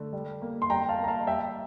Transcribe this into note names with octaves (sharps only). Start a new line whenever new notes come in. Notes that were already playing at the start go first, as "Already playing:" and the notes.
Already playing: D3 A3
G3
A#3
C6
G3 G5 A#5
F5 A5
A#3
A#5
F5 A5
G3 E5 G5